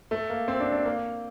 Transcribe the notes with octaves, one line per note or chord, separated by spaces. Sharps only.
A3
A#3
C4
D4
D4
A#3